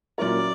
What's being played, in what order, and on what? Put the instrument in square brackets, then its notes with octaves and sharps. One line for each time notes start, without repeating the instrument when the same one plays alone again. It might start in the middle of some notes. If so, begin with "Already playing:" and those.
[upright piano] A#2 F#3 C#4 E4 A#4 [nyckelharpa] D5